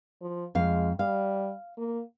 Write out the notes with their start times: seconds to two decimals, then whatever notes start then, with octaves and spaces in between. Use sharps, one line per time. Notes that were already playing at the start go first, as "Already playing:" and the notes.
0.21 F3
0.55 F2 G#3 F5
0.99 G3 F5
1.78 A#3